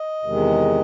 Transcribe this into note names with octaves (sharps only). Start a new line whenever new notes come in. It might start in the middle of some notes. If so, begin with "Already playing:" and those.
Already playing: D#5
E2 C3 D#3 G#3